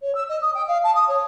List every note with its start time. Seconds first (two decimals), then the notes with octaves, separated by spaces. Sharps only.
0.01 C#5
0.15 E6
0.29 D#5
0.41 D#6
0.54 G5
0.67 F5
0.83 A5
0.95 D#6
1.08 C#5